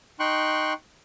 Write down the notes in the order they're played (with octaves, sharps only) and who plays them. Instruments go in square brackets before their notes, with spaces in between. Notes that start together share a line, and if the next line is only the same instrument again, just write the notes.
[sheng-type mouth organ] D#4 G5 C6 C#6 F#6